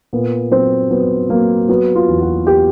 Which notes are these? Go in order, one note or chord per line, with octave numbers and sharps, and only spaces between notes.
A#2 B3
F#3 C4
F#3 B3
F#3 A#3
F#3 B3
F4
E2
F#4
G4